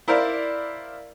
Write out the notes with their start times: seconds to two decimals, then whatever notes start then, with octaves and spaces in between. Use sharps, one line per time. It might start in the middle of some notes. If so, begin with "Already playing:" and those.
0.08 E4 A#4 C5 D5 F5